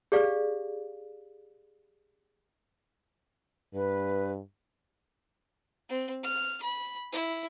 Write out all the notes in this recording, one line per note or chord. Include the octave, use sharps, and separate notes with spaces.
G4 G#4 D5 F5
G2 B4
C4
F6
B5
E4